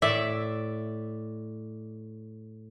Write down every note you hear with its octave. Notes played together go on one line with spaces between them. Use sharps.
A2 D5 E5